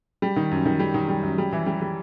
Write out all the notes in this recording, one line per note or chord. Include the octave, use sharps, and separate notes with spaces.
G3
D#3
F#2
D#3
G3
D#3
G3
F#2
G3
E3
G3
G3